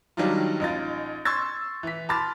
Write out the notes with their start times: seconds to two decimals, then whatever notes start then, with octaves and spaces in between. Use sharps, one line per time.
0.17 D#3 F#3 G3 D4 D#4 F4
0.60 A1 D#4 F4 A6
1.25 C6 C#6 E6 G#6 A6
1.83 E3 B6
2.09 A5 B5 C6 D6 F6 A6